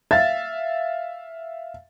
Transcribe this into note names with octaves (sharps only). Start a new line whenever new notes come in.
E5 F5 A6